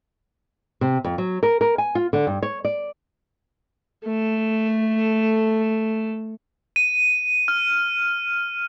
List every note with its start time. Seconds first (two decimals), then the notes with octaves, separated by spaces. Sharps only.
0.81 C3
1.04 F2
1.18 F#3
1.43 A#4
1.61 A#4
1.78 G#5
1.95 F4
2.13 D3
2.27 G2
2.43 C#5
2.65 D5
4.05 A3 A4
6.76 D#7
7.48 F6